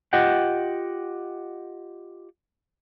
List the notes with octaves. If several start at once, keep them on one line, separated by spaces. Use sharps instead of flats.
F4 G4 D#5 F#5 G5